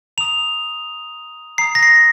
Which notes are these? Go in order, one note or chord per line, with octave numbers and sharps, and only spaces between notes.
A#5 D#6 F7
A#5 D#6 C7
A#6
C7